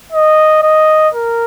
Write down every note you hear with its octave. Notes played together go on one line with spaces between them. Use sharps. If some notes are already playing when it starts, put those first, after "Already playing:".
D#5
D#5
A#4